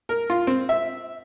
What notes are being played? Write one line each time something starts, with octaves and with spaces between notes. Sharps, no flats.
A#4
F4
C4
E5